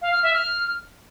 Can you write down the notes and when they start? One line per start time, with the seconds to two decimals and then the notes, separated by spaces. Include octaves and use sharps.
0.02 F5
0.12 F6
0.23 E5
0.34 F6